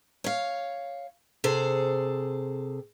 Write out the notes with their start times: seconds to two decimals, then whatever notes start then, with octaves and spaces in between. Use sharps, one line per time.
0.24 C#5 F5
1.44 C3 G#4 A4 C5